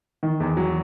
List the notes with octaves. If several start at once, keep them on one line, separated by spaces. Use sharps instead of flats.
D#3
E2
F#3